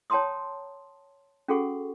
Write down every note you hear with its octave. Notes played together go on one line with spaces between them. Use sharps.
C#5 G5 A5 A#5 C6 D#6
C#4 F#4 G#4 A4 F#5 C#6